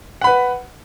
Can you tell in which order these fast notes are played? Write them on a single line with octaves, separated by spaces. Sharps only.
F#5 B5 B4